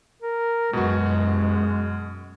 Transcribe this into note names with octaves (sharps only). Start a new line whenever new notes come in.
A#4
F#2 B2 G#3 F#4